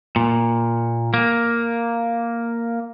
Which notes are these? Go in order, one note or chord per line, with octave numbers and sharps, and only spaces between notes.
A#2
A#3